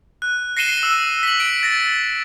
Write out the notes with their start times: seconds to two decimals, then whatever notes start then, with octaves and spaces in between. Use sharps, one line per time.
0.22 F#6
0.57 A#6 C7 C#7 D#7 E7 G7
0.83 E6
1.23 B6 F#7
1.40 D7
1.63 A6 A#6